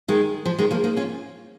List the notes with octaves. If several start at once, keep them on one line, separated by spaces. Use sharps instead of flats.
D#3 G#3
F3
D#3 G#3
F3 A#3
A#3 D#4
C#4 F4